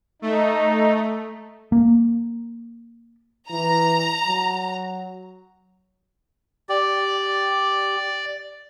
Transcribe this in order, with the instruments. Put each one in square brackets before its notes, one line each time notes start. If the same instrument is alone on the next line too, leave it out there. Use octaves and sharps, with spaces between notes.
[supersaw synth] A3 [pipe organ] D#4
[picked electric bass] A#3
[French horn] E3 [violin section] A#5
[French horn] F#3
[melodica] G4 [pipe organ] D5